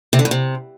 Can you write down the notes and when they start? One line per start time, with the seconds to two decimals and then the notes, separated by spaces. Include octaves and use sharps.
0.13 C3
0.19 D3
0.25 G2
0.31 C3